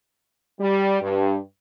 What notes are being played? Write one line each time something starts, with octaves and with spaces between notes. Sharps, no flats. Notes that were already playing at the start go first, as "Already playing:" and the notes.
G3
G2